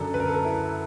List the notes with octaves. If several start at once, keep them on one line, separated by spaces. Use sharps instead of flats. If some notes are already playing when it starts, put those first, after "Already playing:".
Already playing: F#2 D3 F#3 A4
B4
A#4
A4
A#4
E4